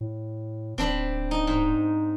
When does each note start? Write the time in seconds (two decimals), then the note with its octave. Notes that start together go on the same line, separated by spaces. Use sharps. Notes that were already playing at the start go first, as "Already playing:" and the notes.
0.01 A2
0.78 D1 C4 D4 B5
1.31 D#4
1.47 G#2